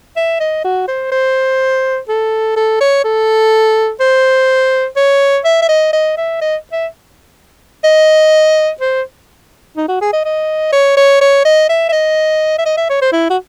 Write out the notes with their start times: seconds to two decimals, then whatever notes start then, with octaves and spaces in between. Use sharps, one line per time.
0.16 E5
0.40 D#5
0.64 F#4
0.88 C5
1.12 C5
2.09 A4
2.56 A4
2.81 C#5
3.04 A4
4.00 C5
4.97 C#5
5.45 E5
5.62 E5
5.69 D#5
5.93 D#5
6.17 E5
6.41 D#5
6.72 E5
7.84 D#5
8.80 C5
9.77 D#4
9.88 F#4
10.02 G#4
10.13 D#5
10.25 D#5
10.72 C#5
10.97 C#5
11.21 C#5
11.45 D#5
11.69 E5
11.89 E5
11.92 D#5
12.59 E5
12.66 D#5
12.77 E5
12.90 C#5
13.02 C5
13.13 E4
13.30 F#4